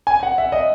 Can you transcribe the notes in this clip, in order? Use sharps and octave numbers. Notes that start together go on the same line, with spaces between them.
G#5
F#5
E5
D#5